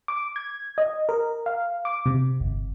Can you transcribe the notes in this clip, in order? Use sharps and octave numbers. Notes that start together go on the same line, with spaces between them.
D6
G#6
D#5
A#4
F5
D6
C3
G1